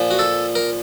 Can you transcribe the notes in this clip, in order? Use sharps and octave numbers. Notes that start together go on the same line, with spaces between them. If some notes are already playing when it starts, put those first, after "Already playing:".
Already playing: A#2 F3
F#4
A4
A#4